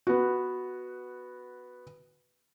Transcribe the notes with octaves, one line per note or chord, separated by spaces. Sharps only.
B3 F#4